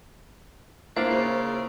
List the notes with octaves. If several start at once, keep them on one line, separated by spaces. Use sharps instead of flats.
A#3 D4 E4 F4 C5
C#3